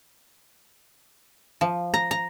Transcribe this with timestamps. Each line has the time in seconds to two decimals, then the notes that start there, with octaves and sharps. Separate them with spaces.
1.61 F3
1.94 A#5
2.11 A#5